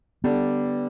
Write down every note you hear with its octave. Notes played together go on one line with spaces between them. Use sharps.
D3 G3 B3 D4